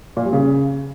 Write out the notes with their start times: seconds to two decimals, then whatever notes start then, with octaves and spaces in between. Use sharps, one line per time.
0.17 A#2
0.25 G3
0.33 C#3